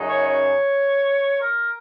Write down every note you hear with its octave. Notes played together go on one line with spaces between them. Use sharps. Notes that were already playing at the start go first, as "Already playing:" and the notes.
Already playing: F#2 C#3 F#3 D#4 G#4
C#5
C#5
A#4